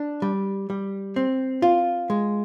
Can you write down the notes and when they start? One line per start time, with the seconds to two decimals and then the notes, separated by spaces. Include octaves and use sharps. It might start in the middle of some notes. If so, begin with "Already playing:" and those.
Already playing: D4
0.22 G3
0.70 G3
1.16 C4
1.62 F4
2.10 G#3